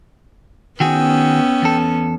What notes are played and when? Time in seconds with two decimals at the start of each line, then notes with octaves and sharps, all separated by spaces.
0.80 D#3 B3 C#4 F#4 G#4 G5 E6
1.62 E2 A4